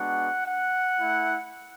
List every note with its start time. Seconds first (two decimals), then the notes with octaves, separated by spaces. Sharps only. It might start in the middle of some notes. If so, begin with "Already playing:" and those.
Already playing: G#3 B3 D4 F#4 F#5
0.44 F#5
0.99 A3 E4